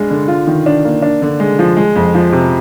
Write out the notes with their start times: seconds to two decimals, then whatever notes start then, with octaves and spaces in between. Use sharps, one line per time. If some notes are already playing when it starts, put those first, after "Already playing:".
Already playing: G2 G#3 D4
0.10 D3
0.28 F4
0.47 D#3
0.66 D4
0.85 A#3
1.02 D4
1.22 D3
1.40 G#3
1.59 F3
1.77 G#3
1.96 F2
2.14 F3
2.33 C3